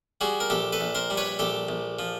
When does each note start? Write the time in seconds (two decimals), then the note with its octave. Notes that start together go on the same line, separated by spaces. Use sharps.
0.21 G3 F#4 G#4
0.40 A#4
0.50 A#1 G4 A4
0.73 A4 B4
0.81 A#1
0.95 A#4 C5
1.10 G3
1.17 B4 C#5
1.39 A#1 G4 A4
1.69 A#1
1.99 F3